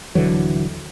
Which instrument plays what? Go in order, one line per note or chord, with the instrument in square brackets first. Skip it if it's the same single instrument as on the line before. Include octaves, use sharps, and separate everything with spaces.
[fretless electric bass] D#1 D3 E3 F#3